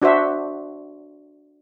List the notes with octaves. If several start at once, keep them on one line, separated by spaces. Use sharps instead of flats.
D4 F#4 C5 E5